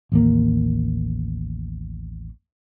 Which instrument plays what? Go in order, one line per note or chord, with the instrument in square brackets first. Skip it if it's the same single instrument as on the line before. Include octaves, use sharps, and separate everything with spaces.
[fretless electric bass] A1 D#2 A#3